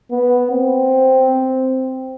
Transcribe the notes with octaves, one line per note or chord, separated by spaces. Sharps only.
B3
C4